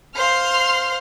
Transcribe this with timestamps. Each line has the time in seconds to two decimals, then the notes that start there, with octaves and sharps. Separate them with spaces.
0.15 C5 F5 C6 F6